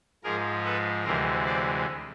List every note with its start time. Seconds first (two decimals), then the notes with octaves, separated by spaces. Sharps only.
0.23 G#2 F3 G#3 G#4 A#4
0.64 A4 B4
1.04 D2 C3 E3 G#3 A#4 C5
1.45 C5 D5